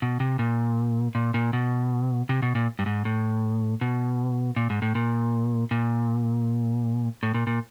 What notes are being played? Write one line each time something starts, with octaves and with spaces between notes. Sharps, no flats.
B2
C3
A#2
A#2
A#2
B2
C3
B2
A#2
G2
G#2
A2
B2
A#2
G#2
A2
A#2
A#2
A2
A#2
A#2